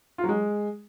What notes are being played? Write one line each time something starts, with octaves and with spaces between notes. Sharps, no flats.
F4
F#3
G#3